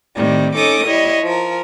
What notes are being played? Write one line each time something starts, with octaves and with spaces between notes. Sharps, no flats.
A2 C3 D#3 G3
C#4 D#4 A4 D6 D#6
G3 E4 C#5 D#5
F3 A#4